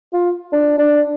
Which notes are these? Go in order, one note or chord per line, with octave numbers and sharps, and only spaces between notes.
F4
D4
D4